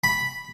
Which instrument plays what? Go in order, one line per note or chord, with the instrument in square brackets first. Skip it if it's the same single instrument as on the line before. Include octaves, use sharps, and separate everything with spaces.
[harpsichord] B5